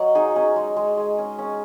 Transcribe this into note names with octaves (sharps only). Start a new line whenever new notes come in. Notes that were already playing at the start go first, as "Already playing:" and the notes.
Already playing: F#3 D#5 F#5
D#4 G#4
C#4 G#4
G#3
G#3
G#3
C#4
C#4